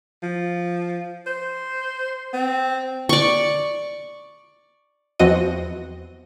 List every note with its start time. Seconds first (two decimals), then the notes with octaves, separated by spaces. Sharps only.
0.23 F3
1.27 C5
2.33 C4
3.09 D5 C#6
5.19 E2 F3 C4 F#4 D#5 D#7